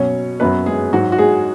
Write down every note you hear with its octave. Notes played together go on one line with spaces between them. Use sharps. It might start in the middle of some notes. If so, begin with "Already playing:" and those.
Already playing: B2 F#3 C#4 C#5
F#2 F#3 B3 B4
G#3 G#4
G#2 F#3 F#4
F#4
G#3 G#4